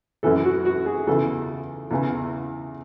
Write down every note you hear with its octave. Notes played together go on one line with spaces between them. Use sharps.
F#2 E3 A4
F#4
F#4
G#4
E2 C#3 E3 A4
E2 C#3 E3